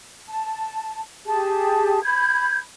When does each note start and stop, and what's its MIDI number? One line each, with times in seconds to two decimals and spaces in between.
0.27 1.00 81
1.26 2.02 67
1.26 2.02 68
1.26 2.02 81
2.03 2.58 83
2.03 2.58 91
2.03 2.58 92